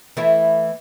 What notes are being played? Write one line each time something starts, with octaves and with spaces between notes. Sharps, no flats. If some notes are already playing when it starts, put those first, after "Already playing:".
E3 A3 E4